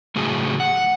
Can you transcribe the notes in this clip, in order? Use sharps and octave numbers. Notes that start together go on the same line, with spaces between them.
A2 C#3 F#3 G#4
F#5